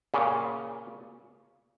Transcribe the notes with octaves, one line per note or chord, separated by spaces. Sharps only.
A#2 C#3